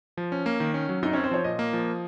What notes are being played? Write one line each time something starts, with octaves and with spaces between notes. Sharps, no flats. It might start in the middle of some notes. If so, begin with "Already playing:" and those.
F3
C#4
A#3
D#3
C#4
F#3
F#2 D#4
C4 C#4
C5
F3 C#5
A#2 D#5
A#3
F3